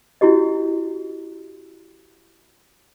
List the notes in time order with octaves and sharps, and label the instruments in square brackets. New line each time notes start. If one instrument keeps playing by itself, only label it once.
[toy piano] C#4 E4 F#4 G4 D#5